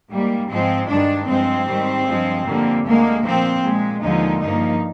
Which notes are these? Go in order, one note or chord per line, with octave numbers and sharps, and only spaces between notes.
G#2 G3 A#3
G#2 F3 G#3 C4
G2 D#3 G#3 D4
G2 F3 G#3 C4
G#2 D#3 G3
G2 F3 G#3
F2 D3 G3 A#3
D2 D3 G#3 A#3
A#2 F3 A#3 C4
A#2 G#3
D#2 D3 F3 G#3 D#4
G2 F3 A#3 D#4